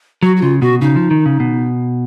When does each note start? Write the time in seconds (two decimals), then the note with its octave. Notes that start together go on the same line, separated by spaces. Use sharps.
0.23 F#3 F#4
0.37 F#4
0.41 C#3 F4
0.61 B2 F#4
0.81 C#3 D#4
0.96 F3
1.11 D#3
1.26 C#3
1.40 B2